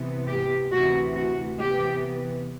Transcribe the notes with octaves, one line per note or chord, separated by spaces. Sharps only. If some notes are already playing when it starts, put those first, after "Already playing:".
Already playing: C3 E3 B3
G4
D2 C3 E3 F#4
F#4
C3 E3 B3 G4